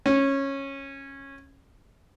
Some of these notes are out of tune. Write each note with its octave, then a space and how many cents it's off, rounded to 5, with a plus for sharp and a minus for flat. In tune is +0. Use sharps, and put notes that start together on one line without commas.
C#4 -15